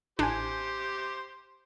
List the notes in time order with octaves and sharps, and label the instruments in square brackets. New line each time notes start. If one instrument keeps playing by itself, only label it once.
[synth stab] A1 G#5 [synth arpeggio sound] D4 [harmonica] G4 C5